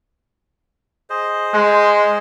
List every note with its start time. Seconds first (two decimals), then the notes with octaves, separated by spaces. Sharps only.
1.10 G#4 C5 D#5
1.54 G#3